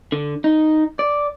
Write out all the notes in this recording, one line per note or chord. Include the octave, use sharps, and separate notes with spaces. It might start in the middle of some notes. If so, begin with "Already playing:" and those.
D3
D#4
D5